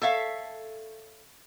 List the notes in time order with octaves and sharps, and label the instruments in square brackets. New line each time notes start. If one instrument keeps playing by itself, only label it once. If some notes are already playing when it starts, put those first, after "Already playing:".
[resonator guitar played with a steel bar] A4 C#5 E5 F5